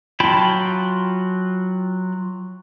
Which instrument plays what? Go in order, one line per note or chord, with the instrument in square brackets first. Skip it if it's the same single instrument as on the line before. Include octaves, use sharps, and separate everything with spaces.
[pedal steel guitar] F#3 F4 G5 A5 B5